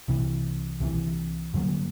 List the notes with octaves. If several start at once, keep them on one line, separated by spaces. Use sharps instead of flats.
C2 C3 E3
C2 C3 E3
G2 D3 F#3 A#3